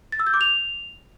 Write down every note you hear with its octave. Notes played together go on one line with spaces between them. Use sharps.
A6
E6
G6
D6
F7